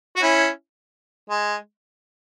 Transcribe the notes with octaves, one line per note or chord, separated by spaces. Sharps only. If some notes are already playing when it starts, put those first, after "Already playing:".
F#4
C#4 E4
G#3